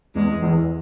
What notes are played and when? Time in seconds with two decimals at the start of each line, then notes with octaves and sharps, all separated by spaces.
0.15 E2 G#3
0.42 E2